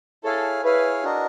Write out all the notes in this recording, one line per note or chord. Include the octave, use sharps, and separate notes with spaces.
E4 G#4 A4 C#5 F5 G#5
E4 G#4 B4 C#5 F5 G#5
D4 F#4 A#4 D#5